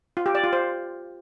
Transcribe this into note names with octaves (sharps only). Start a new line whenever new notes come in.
F4
G4
D5
F4
C5